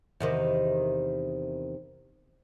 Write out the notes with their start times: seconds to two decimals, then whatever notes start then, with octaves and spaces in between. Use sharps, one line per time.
0.20 E2 C3 D#3